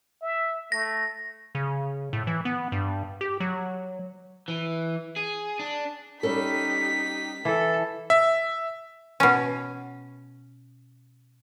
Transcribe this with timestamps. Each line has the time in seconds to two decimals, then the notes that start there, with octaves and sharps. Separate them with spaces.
0.22 E5
0.72 A3 A#6
1.55 C#3
2.13 A2
2.27 E3
2.45 B3
2.72 G2
3.21 G4
3.40 F#3
4.48 E3
5.16 G#4
5.59 D4
6.23 G3 C#4 D#4 G4 A4 B6
7.45 E3 A4 A5
8.10 E5
9.20 B2 C#4